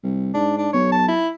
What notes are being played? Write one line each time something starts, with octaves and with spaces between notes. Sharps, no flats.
C2
G#2 D4
D4
B1 C#5
A5
E4